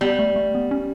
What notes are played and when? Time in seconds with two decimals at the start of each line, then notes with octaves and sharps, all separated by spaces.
0.01 G3 B3
0.19 A3
0.36 A3
0.55 B3
0.71 C#4